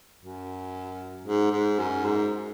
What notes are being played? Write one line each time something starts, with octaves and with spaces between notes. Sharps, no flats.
F#2
G#2
G#2
F#2
G#2